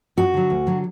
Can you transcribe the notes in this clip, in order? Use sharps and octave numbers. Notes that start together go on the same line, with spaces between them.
F#2 F#4
D3 F#3
D2
D3 F#3